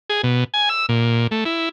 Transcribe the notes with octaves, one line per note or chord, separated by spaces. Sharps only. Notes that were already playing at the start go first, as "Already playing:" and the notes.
G#4
B2
G#5
E6
A#2
A3
E4